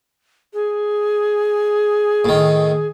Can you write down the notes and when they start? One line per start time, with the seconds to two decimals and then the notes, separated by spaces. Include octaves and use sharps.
0.54 G#4
2.25 A2 D#3